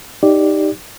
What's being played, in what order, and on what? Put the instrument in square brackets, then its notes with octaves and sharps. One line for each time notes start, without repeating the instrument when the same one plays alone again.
[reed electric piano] D#4 G4 D5